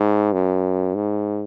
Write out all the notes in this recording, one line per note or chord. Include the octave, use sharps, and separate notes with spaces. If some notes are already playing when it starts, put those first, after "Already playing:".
Already playing: G#2
F#2
G#2